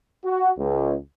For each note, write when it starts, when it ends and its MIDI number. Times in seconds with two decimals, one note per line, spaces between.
0.25 0.49 66
0.57 0.95 37